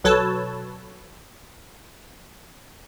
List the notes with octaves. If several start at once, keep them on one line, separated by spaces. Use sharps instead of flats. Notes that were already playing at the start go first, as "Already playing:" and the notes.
B1 F#3 A4 B4 C#5 A5